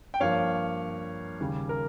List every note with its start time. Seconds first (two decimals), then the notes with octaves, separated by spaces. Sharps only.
0.14 G5
0.20 G2 F3 A#3 C#5 F5
1.40 D#2 C#3 G3
1.69 A#4